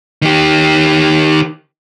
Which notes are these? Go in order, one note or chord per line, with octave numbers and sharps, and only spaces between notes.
D#3 G4